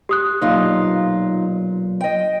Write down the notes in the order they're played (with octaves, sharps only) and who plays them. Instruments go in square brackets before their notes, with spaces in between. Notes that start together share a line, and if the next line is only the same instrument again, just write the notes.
[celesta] G4 D#6 F#6
[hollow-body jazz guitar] B1 A#2 [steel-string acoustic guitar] D#4 F4
[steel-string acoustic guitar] D#5 G5